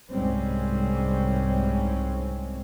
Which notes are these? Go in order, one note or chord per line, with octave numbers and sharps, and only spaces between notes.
C2 G#2 G3 G#3 C4 C#4